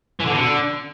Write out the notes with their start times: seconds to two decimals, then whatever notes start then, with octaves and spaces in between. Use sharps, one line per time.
0.20 E3
0.26 D3
0.31 B2
0.37 D3